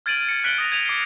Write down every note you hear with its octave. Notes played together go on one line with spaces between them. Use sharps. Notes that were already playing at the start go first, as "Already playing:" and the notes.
F6 G#6 A6 D7 D#7 F#7
A6 C#7 D7
F#6 B6 D7 F#7 G7
D#6 A#6 F7
G#6 D#7 F7
D6 C7 G7